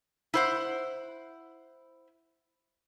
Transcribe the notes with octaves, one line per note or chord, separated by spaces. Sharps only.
E4 C5 F#5